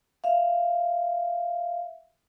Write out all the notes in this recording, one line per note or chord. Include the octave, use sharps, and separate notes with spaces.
E5 F5